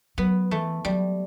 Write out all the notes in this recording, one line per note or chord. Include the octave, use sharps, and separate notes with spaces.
F#3 B3
E3 A3
F#3 G3